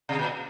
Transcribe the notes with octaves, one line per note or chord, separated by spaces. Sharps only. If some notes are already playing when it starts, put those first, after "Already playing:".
C3
A#2